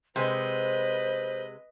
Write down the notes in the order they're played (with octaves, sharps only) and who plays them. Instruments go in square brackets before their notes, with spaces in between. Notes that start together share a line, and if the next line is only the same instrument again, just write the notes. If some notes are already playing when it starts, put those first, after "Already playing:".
[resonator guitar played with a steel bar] C3 G#3 [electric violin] B4 D#5 [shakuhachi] C5